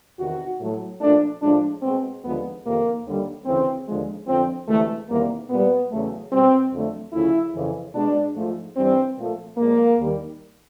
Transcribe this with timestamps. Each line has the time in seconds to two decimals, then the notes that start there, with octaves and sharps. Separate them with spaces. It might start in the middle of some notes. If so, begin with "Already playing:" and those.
0.19 E2 C3 D#3 F#4
0.60 A2 F#3 A3
1.01 A#2 F3 A3 D4
1.42 A2 F3 G#3 D4
1.82 B2 G#3 C4
2.23 D#2 D3 F3 G#3 B3
2.64 F2 C3 D#3 A#3
3.05 D#2 D3 G3
3.45 D2 C#3 E3 C4
3.86 D#2 D3 F3 G#3
4.27 F2 D3 F3 C4
4.68 D2 C3 E3 G#3 A3
5.09 E2 C3 D#3 G3 A#3
5.50 A#2 G3 B3
5.91 E2 C#3 F#3 A3
6.31 B2 G3 C4
6.72 F2 D3 F#3 A3
7.13 D2 C#3 F3 A3 E4
7.54 F2 C#3 E3
7.94 B2 G#3 D4
8.35 G#2 F3 A3
8.76 G2 E3 G3 C4
9.17 A#2 F3 A3
9.57 A#2 F3 G#3 A#3
9.98 D#2 D#3 G3